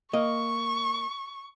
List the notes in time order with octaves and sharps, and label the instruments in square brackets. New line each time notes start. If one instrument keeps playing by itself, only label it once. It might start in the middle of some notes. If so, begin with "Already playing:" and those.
[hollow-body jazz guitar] A#3 D#5 [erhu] C#6